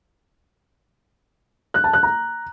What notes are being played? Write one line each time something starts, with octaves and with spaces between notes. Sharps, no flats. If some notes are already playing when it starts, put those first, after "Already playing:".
F#6
A5
F#6
A#5